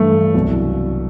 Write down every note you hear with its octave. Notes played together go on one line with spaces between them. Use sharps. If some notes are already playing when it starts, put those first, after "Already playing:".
Already playing: G2 E3 A3
C2 B2 F#3